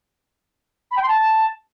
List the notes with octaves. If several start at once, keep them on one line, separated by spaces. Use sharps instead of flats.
B5
G5
C6
A5